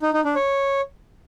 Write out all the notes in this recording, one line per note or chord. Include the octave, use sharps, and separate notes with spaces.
D#4
D#4
D4
C#5